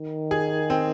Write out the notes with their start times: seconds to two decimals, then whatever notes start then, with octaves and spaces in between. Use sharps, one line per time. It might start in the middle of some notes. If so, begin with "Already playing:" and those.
Already playing: D#3
0.31 G#4
0.70 C4